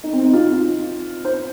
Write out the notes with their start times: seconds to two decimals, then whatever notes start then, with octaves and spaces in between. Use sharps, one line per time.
0.03 D#4
0.13 C4
0.24 D#4
0.33 F4
1.25 C5